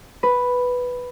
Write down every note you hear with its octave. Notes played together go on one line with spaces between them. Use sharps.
B4